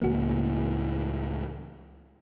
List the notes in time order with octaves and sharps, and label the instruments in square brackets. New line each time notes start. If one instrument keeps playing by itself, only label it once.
[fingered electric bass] C#2 A2 E3 [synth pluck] A#3 F#4